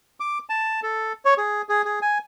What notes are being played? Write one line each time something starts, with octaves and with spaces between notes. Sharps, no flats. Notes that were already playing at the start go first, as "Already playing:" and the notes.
D6
A5
A4
C#5
G#4
G#4
G#4
G#5